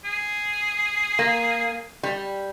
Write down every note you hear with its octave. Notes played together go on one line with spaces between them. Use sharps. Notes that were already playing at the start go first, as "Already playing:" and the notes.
G#4
A#3
G3